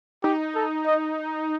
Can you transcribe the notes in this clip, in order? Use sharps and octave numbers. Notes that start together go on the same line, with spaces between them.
D#4 G4
A4
D#5